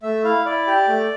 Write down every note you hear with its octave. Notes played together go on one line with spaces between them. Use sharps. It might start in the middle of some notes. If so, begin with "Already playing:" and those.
A3 E5
E4 F5
E4 D5
G4
A3